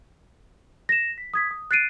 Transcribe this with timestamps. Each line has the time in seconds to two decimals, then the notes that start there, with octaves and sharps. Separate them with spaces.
0.89 A#6 E7
1.18 B6
1.34 D#6 G#6 B6
1.51 D#6
1.71 F#6 A6 C7 D7 D#7